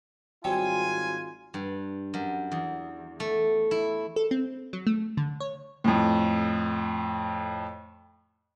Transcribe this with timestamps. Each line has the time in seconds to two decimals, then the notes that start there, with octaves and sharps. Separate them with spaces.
0.44 G#1 F#3 G3 C4 F4 G#5
1.54 G2
2.14 F#2
2.52 E2
3.20 A3
3.71 E4
4.16 A4
4.31 C4
4.73 F#3
4.87 A3
5.17 D3
5.40 C#5
5.84 F2 A2